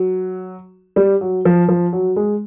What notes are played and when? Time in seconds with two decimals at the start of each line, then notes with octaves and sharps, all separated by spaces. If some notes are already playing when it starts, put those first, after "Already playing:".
Already playing: F#3
0.96 G3
1.21 F#3
1.45 F3
1.69 F3
1.93 F#3
2.16 G#3